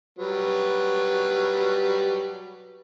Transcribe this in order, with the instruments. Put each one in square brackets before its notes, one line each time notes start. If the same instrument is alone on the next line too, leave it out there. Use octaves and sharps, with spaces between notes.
[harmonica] F#3 G3 B4